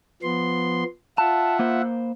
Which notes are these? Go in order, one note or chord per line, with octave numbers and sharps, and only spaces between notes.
F3 B3 C6
F4 E5 F#5 A5
A#3 C5